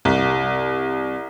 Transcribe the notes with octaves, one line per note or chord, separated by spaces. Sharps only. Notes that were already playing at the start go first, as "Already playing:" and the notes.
C2